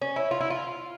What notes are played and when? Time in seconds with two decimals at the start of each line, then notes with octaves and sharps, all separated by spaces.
0.01 C#4
0.16 E4
0.31 F4
0.41 E4
0.50 F4